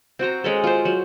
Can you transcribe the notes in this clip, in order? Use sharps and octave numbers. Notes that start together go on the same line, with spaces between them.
C4 F#4 C5 A#5
G#3 C#4 A4
F4 C5
F#3